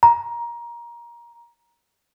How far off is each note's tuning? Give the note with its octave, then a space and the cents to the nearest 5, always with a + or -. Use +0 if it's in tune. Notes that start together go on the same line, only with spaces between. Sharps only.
A#5 +20